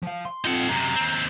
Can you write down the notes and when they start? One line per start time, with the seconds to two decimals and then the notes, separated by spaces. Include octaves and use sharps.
0.03 F3 F5
0.25 C6
0.45 C4 D#4 F4 F#5
0.69 F#2 C3 A#5
0.95 D#2 C4